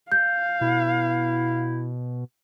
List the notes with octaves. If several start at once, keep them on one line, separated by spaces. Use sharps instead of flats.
F5 G6
B2 E4